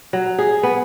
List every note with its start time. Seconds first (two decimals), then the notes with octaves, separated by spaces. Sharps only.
0.13 F#3
0.38 G#4
0.63 B3